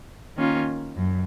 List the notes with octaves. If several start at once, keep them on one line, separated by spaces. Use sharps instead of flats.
D#3 A#3 C#4 F4
F#2